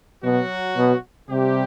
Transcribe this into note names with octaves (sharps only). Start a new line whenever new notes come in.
B2 F#3 F#4
B2
C3 G3 G4